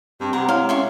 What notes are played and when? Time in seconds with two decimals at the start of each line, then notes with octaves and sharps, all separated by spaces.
0.21 G2 C4 G4
0.33 C3 F#5 A#5
0.49 G#3 E4 C#5 F5
0.69 C#4 E5 C6 C#6